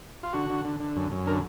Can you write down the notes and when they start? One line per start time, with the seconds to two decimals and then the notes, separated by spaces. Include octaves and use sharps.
0.23 F4
0.33 D3 F#4
0.50 D3
0.65 D3
0.80 D3
0.96 F#2
1.11 F#2
1.26 D3 A#4